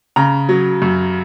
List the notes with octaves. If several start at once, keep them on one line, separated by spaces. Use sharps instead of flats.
C#3 A#5
F#3
F#2